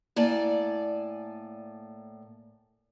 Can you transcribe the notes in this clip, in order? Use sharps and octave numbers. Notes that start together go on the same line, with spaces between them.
A2 A#3 D5 G#5 A5